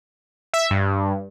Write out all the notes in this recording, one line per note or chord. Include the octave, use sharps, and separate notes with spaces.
E5
G2